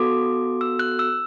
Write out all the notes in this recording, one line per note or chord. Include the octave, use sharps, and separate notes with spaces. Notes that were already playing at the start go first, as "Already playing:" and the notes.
Already playing: B3 F#4 A4 D6
E6
F#6
E6